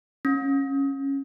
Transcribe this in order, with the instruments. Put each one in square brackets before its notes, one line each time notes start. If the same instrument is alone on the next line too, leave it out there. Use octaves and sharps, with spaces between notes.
[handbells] C#4